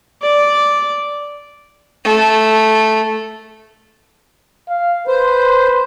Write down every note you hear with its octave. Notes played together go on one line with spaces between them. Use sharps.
D5
A3
F5
B4 C5